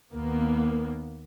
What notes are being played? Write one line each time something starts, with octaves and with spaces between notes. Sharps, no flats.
D#2 A#3 B3